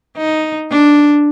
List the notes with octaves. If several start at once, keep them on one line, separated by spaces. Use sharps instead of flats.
D#4
D4